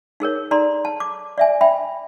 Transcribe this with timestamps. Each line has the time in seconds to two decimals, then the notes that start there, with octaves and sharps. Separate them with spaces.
0.20 D#4 G#4 A#4 C#5
0.51 D#4 A4 D5 A#5 C6
0.85 A5
1.00 D6
1.38 D5 E5 G#5
1.61 E5 G5 B5